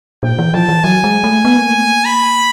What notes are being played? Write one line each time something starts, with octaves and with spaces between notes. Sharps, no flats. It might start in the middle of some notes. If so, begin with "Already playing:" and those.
A#2 G5
E3
F3 A5
E3
F#3 G#5
G#3
A3
B3
A#3
A3
A#3
B5